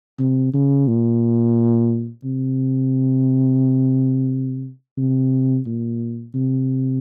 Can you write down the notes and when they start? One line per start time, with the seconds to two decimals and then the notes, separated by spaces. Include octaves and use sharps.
0.19 C3
0.54 C#3
0.88 A#2
2.24 C3
4.97 C3
5.66 A#2
6.34 C3